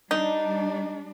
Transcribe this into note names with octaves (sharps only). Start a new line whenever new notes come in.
G3 D4 D#4